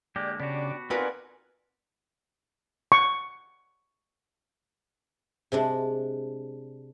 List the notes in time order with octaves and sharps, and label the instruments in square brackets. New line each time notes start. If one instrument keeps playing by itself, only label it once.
[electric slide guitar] D3 G#3 A#3 [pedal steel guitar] G4 [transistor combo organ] D5
[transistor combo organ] C#3 D5 [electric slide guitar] B3 F#4 [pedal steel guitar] D4 G4
[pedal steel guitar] C4 D#4 [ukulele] F4 A#4 B4 [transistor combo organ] D5 F#5 G#5
[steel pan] C#6
[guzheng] C3 G#3 D4